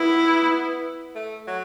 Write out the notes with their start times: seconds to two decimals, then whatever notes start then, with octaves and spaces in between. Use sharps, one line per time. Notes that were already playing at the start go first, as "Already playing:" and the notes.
Already playing: B3 E4
1.15 A3
1.47 F#3